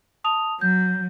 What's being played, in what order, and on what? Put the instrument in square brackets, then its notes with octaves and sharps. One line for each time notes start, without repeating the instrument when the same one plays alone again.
[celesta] A5 D#6 F7
[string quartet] F#3 [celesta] G6